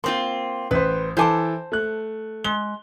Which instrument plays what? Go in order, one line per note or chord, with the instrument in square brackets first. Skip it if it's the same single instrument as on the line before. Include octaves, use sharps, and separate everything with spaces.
[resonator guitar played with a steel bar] A#3 C4 F4 [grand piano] C6
[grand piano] A1 C5 [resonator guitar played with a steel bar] B4
[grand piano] E3 A4 D6 [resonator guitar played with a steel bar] C5 G#5 A5
[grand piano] A3 F#6
[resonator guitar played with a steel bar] G#3 [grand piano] G7